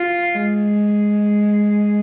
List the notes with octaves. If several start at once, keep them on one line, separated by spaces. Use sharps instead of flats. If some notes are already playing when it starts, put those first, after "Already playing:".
Already playing: F4
G#3